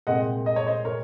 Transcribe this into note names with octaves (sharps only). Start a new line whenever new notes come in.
C2 A#2 G#3 C4 D#5 F#5
D#5
C#5
C5 D#5
A#4 C#5